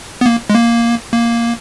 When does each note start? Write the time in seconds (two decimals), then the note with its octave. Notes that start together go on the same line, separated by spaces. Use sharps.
0.21 B3
0.26 A#3
0.50 G#3
0.55 A#3
1.12 A#3